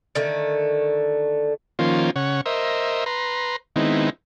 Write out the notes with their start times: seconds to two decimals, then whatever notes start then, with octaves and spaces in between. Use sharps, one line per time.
0.15 D3 D#3 A3
1.79 D#3 F3 A#3 C#4 F4 C5
2.16 C#3 C#5 F#5
2.46 A#4 C5 D#5 E5
3.06 B4 A#5 C6
3.76 D#3 G#3 B3 C4 D#4 E4